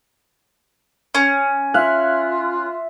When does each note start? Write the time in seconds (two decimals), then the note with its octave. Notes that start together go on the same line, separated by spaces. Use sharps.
1.15 C#4
1.74 F4 E5 F5 F6 F#6